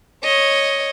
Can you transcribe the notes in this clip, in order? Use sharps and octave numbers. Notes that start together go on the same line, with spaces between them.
C#5 D#5